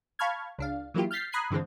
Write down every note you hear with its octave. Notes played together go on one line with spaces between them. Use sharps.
F5 A5 B5 C#6 F6 G#6
C#2 D4 F5
E3 F#3 A#3 E4 F4 G4
F6 G6 A6 B6 C7
A#5 B5 D#6 F#6 G#6 C7
G2 D3 E3 G#3 C4